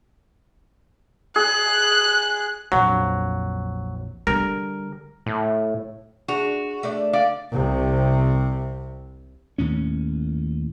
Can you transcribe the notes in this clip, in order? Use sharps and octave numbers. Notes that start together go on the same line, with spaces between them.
G#4 F#6
A#1 F2 F#3
D3 G3 A#4
A2
D4 F#4 G#4 F7
A3 D4 D5
D5 F5
C2 C3
D#2 A2 C#4